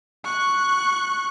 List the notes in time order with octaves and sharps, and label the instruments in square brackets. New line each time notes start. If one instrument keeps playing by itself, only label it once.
[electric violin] C#6 F#6